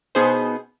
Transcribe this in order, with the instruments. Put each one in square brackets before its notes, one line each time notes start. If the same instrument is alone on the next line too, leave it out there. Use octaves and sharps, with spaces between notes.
[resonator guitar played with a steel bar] B2 B3 D#4 [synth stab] G#4 C5